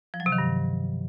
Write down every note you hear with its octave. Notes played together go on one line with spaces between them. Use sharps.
F3
F#3
C3
D#3
G2